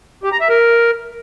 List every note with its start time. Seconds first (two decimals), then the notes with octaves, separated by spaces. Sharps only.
0.23 G4
0.32 A#5
0.41 E5
0.49 A#4